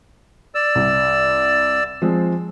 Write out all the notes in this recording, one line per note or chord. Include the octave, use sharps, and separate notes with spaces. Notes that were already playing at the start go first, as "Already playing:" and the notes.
D5 E6
C2
F3 G#3 C4